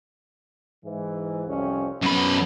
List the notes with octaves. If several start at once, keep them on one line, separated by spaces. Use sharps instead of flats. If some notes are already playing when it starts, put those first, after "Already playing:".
G#2 E3
C2 F2 C#4
F#2 F#3 B3 B5